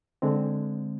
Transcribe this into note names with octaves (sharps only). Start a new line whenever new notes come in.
D3 G#3 C4